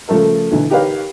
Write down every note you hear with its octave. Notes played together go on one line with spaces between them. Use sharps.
C#3 F3 A3 A4 A#4
B1 D3 E3
D#4 G4 A#4 B4 C#5 F5